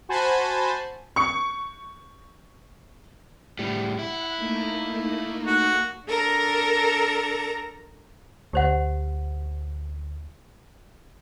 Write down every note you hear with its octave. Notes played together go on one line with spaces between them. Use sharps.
F#4 C5 G#5 A5 B5
C#6 C#7
A2 G3
E4 F#5
A3 A#3 D#4
F#4
D4 A4 A#4 A#5
D2 G4 C5 F#5